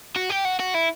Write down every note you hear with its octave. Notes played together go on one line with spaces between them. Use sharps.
F#4
G4
F#4
F#4
E4